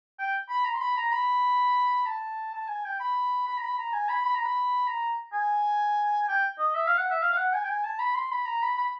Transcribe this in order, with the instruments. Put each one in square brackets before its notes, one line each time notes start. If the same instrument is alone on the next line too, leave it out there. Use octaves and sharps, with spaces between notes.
[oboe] G5
B5
A#5
C6
B5
A#5
B5
A5
A5
G#5
G5
B5
B5
A#5
B5
A#5
G#5
B5
B5
A#5
B5
A#5
G#5
G5
D#5
E5
F5
F#5
E5
F5
F5
F#5
G#5
G5
G#5
A5
B5
C6
B5
A#5
B5
B5